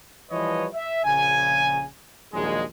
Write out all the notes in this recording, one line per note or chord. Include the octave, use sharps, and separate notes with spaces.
E3 F3 G3 B4 C#5 D#5
E5
A#1 C#3 G#5
A#1 D#2 D#3 F#3 G#3